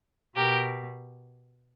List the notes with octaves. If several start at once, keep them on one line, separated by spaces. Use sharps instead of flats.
B2 G4 A#4